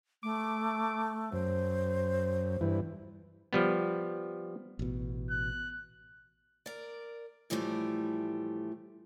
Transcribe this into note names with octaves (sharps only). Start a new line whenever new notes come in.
A3 D6
F#2 C5
G2 E3
F3 G3 B3
A1 B2
F#6
A#4 D5
A2 E3 F3 G3 A3